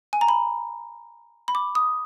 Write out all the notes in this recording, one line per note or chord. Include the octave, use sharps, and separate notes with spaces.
G#5
A#5
B5
B5
D6
D#6